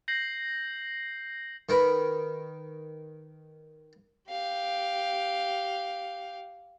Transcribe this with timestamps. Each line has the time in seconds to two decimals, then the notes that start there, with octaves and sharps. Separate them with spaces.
0.08 G6 A#6 C7 F#7
1.69 D#3 A#4 B4
4.29 G4 F5